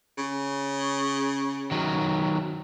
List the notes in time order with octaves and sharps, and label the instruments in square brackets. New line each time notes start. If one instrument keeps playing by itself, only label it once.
[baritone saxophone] C#3
[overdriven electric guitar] D#3 F#3